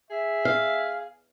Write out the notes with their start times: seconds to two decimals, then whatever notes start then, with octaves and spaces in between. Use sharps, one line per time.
0.11 G#4 E5
0.45 F5